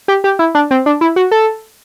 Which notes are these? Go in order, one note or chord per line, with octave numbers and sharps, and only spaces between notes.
G4
G4
E4
D4
C4
D4
E4
F#4
A4